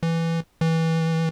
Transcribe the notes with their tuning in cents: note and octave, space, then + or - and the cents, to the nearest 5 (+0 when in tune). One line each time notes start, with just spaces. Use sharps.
E3 +5
E3 -20